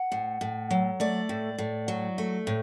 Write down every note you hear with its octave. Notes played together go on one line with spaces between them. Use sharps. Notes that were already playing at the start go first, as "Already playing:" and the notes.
Already playing: F#5
A2
A2
F#3
A3 D5
A2
A2
F#3
A3
A2